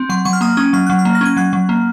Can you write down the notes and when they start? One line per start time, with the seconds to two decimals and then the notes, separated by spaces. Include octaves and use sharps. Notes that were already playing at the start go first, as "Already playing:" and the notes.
Already playing: C4
0.09 F#3 C6
0.25 F#3 C#6
0.33 F6
0.41 A#3 D#6
0.57 C#4 D#6
0.73 F#3 F6
0.86 F#3 F#6
0.99 F6
1.05 A#3
1.15 A#6
1.21 C#4 G#6
1.37 F#3 F#6
1.53 F#3
1.69 A#3